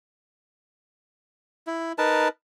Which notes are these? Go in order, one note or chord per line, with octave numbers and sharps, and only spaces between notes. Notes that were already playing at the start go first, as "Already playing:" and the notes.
E4
D#4 A#4 B4 A5